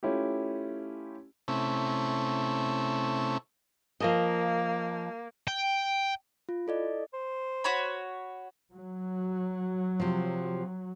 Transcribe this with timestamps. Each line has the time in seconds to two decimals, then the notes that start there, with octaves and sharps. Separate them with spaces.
0.03 A3 C#4 E4 F4 G4
1.48 C3 A3 C#4 E4
4.00 F3 A#3 A#4 D#5
5.48 G5
6.49 F4
6.67 E4 A4 D5 D#5
7.14 C5
7.64 F#4 C#5 B5
8.72 F#3
10.00 C3 F3